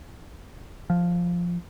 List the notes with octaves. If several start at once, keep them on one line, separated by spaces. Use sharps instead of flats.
F3